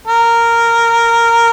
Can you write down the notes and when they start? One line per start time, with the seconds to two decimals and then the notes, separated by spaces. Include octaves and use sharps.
0.07 A#4